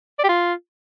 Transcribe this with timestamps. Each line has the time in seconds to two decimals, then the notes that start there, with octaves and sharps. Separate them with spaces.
0.19 D5
0.24 G4
0.29 F4